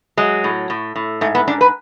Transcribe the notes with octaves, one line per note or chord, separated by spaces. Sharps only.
F#3 G#3
A2
A2
A2
G#2 A3
B3
G#2 D4
B4